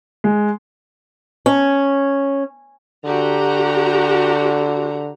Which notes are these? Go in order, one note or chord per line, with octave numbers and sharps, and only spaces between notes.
G#3
C#4
D3 F#4 G4 A#5